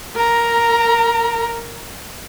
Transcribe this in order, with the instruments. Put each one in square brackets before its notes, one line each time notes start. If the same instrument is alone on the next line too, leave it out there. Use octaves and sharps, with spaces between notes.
[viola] A#4 A#5